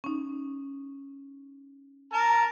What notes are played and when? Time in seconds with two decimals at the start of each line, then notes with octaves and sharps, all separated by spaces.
0.04 C#4 D#4
2.13 A#4 A5 A#5